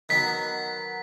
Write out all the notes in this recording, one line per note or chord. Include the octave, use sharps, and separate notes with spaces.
D#3 F#3 B3 B6